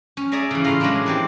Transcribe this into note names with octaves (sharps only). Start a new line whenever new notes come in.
C#4
G#4 D5 E5 A#5
C#3 E3
A2 F4 F5 A#5 C6
F#3 G#3 A#3 C#4 D4 E4
E3 C4 G4